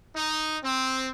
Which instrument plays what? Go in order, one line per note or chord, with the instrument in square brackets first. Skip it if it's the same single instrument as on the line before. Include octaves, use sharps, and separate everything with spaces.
[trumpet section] D#4
C4